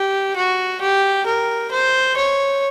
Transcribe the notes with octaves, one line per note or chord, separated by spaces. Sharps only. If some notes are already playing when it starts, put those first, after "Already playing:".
Already playing: G4
F#4
G4
A#4
C5
C#5